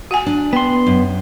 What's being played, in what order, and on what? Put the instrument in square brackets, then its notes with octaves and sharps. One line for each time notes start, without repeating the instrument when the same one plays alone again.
[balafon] F#4 F#5 G#5
[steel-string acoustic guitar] D4
[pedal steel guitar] B3 C6 [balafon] G5
[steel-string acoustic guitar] F#2